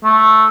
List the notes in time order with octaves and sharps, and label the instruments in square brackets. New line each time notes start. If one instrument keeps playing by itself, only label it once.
[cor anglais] A3